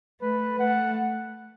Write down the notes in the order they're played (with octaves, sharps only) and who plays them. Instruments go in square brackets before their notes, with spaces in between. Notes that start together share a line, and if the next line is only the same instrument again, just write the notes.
[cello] A3 [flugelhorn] B4
[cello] A3 [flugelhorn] F#5